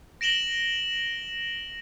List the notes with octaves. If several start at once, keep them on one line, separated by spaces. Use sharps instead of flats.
A#6 D7 E7 F#7 G7